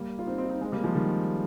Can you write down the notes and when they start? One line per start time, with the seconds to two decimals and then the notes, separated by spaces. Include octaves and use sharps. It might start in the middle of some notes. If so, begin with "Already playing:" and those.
Already playing: G3 A#3
0.19 F4
0.27 C4 D#4
0.38 C4 D#4
0.45 F4
0.49 C4 D#4
0.61 G#3 C4
0.72 G3 A#3
0.83 F3 G#3
0.95 D#3 G3